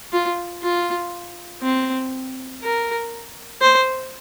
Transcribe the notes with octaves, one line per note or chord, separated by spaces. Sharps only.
F4
F4
C4
A#4
C5